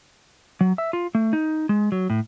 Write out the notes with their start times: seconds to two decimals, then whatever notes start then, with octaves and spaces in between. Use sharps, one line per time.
0.61 F#3
0.78 E5
0.93 F4
1.15 A3
1.33 D#4
1.69 G#3
1.92 F#3
2.10 A2